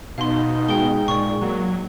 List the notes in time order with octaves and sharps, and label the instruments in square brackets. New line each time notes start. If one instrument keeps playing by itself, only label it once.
[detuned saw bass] B2 [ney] D#4 [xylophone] F5 C6
[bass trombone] G#3 [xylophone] G5 G7
[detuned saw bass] A#2 [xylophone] D5 C#6
[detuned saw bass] F#3 [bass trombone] A#3